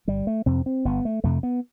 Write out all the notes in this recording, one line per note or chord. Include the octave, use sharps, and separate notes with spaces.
G1 G3
A3
F2 C3 C4
C4
G1 B3
A3
F2 C3 A3
B3